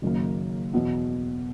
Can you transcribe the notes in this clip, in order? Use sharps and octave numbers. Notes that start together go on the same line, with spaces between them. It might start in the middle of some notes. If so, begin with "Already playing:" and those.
F#1 F#2 D#3 F#3 A#3
E2 B2 F#3 B3 E4